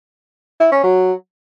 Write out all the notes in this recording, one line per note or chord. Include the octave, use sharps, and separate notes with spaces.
E4
C#4
F#3